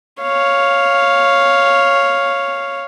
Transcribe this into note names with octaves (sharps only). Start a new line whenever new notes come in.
C#5 F5